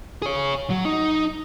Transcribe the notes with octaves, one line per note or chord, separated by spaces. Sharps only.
G#4 C#5
F#3
D#4